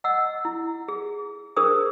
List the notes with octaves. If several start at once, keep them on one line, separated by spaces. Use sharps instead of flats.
D#5 F#5 E6
E4
G#4
D4 G#4 A#4 C5 D#6